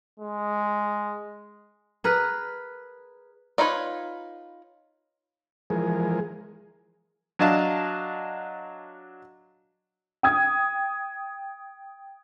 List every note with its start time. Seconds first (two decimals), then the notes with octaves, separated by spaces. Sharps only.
0.20 G#3
2.04 G#4 A#4 B4
3.58 D4 D#4 F4 B4 C#5
5.70 E3 F3 G#3 G#4 A#4
7.39 F#3 D4 D#5 F5 A5
10.23 G5 D#6 G#6